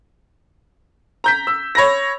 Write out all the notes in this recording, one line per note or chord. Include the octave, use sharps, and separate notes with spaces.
A#5 G6 B6
E6
C#5 B5 A#6